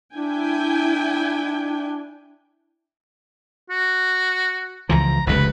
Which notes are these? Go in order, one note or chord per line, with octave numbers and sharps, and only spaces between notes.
D4 E4 G5 G#5
F#4
C#2 E3 F3 A#5
F1 C#2 C#3 B4